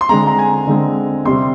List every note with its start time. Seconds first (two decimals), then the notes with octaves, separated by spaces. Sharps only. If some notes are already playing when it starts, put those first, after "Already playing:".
0.01 C6
0.09 D3 G#3 C4 A#5
0.27 A#5
0.39 G#5
0.67 D3 G#3 C4
1.25 C3 G3 C4 C6